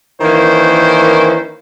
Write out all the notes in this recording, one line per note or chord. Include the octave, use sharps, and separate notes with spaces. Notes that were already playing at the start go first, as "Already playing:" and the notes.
D#3 E3 A#3 C#4 C5